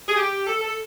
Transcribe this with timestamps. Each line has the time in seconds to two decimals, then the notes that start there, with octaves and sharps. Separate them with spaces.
0.08 G#4
0.17 G4
0.47 A4
0.61 A4